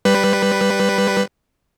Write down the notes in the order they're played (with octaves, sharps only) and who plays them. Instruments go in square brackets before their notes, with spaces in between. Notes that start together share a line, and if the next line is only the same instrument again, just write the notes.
[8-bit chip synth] G3 B4